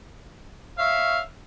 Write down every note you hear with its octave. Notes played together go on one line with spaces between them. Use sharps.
C#5 E5 F5